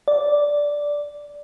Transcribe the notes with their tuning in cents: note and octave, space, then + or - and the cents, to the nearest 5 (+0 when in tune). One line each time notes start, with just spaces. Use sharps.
D5 -5